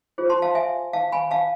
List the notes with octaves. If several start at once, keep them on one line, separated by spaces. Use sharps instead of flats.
F4 G#4 C5
A5 C6
F5 A5
E5 G#5
F5 A5
G#5 B5
F5 A5